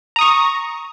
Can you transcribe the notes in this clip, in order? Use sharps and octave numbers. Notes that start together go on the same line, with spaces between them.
A#5 C#6 D#6